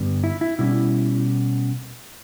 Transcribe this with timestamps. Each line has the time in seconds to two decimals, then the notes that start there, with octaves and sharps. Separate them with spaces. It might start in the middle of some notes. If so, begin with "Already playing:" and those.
Already playing: G2 D3 G3 B3
0.24 E4
0.41 E4
0.59 B2 G3 C#4 E4